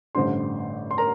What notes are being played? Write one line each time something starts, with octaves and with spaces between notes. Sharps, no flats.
A1 G2 D3 C5 C6
C6
A#4 A#5